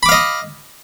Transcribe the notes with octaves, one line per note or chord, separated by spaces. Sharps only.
D#5 F5 B5 D6